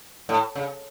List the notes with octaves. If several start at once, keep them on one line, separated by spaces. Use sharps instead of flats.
A2
C#3